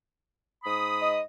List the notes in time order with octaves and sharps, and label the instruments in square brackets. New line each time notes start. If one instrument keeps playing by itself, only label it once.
[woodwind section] G#2 B5 D#6
[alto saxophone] D#5